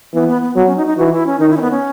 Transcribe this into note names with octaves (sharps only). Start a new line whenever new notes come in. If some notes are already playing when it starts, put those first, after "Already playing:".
E3 B3
B3
B3
F#3 B3
C#4
D#4
D#4
E3 F#4
E4
C#4
D#3 D#4
E4
C#4
B3
C#4